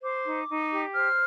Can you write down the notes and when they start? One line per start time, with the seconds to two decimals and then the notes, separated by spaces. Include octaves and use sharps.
0.02 C5 D6
0.25 D#4
0.48 D#4
0.71 G4
0.93 C5 F6